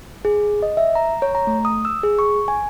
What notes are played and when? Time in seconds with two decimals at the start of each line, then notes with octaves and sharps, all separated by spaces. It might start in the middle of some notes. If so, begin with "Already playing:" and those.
0.25 G#4
0.62 D#5
0.77 E5
0.95 A#5
1.22 C#5
1.35 A#5
1.47 A3
1.65 D#6
1.85 E6
2.03 G#4
2.19 C#6
2.48 G#5